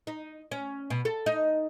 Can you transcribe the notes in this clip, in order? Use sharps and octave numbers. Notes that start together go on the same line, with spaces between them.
D#4
C#4
B2
A4
D#4